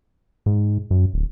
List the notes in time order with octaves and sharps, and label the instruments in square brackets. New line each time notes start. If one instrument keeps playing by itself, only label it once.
[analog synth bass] G#2
F#2
D1